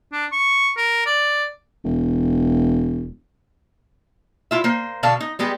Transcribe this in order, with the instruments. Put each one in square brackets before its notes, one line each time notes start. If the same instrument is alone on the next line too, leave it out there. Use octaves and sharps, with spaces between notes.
[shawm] D4
C#6
A#4
D5
[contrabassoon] E1
[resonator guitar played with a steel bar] E4 F4 E5
A#3 C5
B2 D3 D4 A4 F5
D#4
G3 G#3 B3 G4